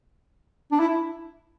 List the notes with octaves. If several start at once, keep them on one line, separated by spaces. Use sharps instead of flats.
D4
E4